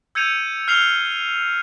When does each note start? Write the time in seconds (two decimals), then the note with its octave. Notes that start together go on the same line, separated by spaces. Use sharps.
0.15 E6 G6 G#6 C#7 D#7 F7
0.68 F6 C7 F7 G7